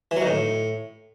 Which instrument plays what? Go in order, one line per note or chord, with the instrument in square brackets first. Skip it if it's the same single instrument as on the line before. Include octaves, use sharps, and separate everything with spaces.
[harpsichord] E3
F#3
D#3
A2